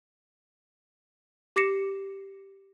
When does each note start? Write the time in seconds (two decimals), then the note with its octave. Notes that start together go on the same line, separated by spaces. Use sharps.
1.56 G4 D6 A#6 C7 C#7 E7